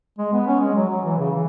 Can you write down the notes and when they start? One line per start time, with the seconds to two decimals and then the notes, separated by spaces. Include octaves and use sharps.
0.18 G#3
0.33 B3
0.47 C#4
0.61 G#3
0.75 F#3
0.89 F#3
1.04 E3
1.18 C#3
1.32 E3